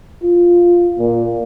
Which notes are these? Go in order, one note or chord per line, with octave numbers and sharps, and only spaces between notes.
F4
A#2